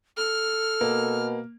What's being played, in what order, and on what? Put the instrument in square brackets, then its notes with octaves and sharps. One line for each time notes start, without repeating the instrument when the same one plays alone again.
[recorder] A4 [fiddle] F6
[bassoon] B2 [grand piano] A#3